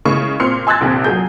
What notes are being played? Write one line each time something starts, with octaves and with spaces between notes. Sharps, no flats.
C#3 G#3 E4 C#6
A#2 C4 C6 F6 C#7
G#5 C6 E6 F#6 G#6 A6
A#1 D#2 C3
F#3 G#4 G6